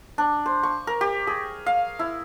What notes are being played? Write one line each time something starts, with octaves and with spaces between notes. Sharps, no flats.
D4
C5
C#6
A#4
G4
G#4
F5
E4